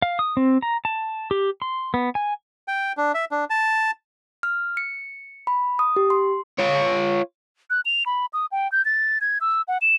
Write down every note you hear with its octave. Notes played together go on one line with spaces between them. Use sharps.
F5
D#6
C4
A#5
A5
G4
C6
B3
G#5
G5
D4
E5
D4
A5
F6
C#7
B5
D#6
G4
C6
F4 C#5
F#6
F7
B5
D#6
G5
G6
A6
G#6
E6
F#5
E7